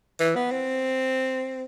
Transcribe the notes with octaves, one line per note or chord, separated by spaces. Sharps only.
E3
B3
C4